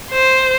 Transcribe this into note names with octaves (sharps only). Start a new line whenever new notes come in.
C5